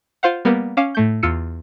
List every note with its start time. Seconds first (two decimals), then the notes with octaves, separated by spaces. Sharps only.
0.23 F4 C5 F5 F#5
0.45 G3 A#3 B3
0.77 C#4 F5 D6 E7
0.95 A2 A3 G6
1.23 E2 F4 E6 C#7